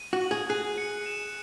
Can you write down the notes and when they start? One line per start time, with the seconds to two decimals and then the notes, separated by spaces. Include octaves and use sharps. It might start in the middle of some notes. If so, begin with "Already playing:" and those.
Already playing: D#7
0.13 F#4
0.21 F#7
0.31 G#4
0.49 G#4 F#6
0.78 C#7
1.06 E7